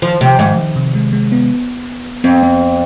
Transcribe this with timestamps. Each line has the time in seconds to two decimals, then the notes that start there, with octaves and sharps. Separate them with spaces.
0.02 D#3 F3
0.21 C3 F3
0.39 G#2 D#3
0.58 D#3
0.76 C3
0.95 G#3
1.13 G#3
1.32 B3
2.24 F2 C4
2.43 C4